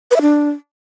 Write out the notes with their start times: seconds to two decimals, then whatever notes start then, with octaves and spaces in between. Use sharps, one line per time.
0.11 B4
0.16 E5
0.21 D4